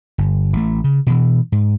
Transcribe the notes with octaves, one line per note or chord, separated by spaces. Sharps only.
G1
A1 A3
C#3
B2 E3
G#2